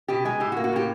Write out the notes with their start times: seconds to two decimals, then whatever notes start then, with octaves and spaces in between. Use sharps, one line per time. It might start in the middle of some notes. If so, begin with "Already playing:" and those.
0.08 B2 G4
0.25 G#3 G#4
0.40 A2 G4
0.52 F#4
0.57 A#3
0.64 F#4
0.73 A2 G4